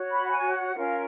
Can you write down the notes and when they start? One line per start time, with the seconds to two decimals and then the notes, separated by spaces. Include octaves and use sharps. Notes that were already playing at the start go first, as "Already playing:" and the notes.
Already playing: F#4 C#5
0.11 B5
0.24 F#5
0.32 G#5
0.54 F#5
0.75 C#4 F4 A#4 F5